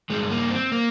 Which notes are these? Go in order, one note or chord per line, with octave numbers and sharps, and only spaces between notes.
G2 D#3 G#3
A#3
C4
A#3